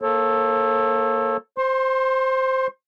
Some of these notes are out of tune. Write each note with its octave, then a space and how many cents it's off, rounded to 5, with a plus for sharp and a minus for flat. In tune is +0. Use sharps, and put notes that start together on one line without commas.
A#3 +0 A4 +0 C#5 -40
C5 +0 C6 +35